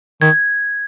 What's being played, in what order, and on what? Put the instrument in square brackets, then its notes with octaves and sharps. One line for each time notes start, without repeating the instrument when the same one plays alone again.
[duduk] D#3 [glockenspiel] G#6